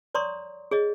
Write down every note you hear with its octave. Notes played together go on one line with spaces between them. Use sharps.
C#5 D5 A#5 C6 C#6 D#6
G#4 C#5 D#5